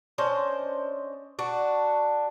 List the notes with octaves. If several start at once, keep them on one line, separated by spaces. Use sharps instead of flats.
C#4 D4 C5 D#5
D4 F#4